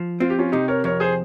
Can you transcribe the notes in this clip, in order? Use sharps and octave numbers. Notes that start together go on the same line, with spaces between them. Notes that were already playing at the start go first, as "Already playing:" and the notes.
Already playing: F3
C4 F4
G4
C#4 F4
C3 D#4 G4
A#4 C#5
F2 A#4 C#5
G#4 C5